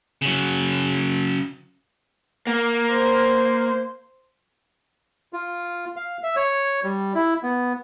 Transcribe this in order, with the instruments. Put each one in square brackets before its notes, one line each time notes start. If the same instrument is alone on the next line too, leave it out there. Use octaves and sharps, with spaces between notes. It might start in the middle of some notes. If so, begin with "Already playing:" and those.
[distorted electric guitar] C#3 F#3
[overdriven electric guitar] A#3
[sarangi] C5
[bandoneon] F4
F5
E5
C#5
G3
E4
B3